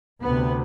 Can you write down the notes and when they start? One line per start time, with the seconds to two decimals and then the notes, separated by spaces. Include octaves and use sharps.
0.22 D2 C3 B3